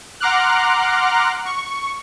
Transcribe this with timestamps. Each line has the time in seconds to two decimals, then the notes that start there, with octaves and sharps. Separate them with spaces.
0.20 F#5 A#5 C6 D6 F6 F#6
1.45 C#6